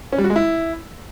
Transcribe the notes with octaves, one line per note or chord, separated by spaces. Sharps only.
C#4
G3
F#4
G#3
E4